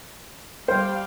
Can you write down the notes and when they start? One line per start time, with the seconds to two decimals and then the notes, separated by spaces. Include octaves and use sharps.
0.68 G3 C5 F5 G5